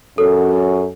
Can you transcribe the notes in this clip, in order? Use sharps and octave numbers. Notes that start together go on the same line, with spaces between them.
F#2 A4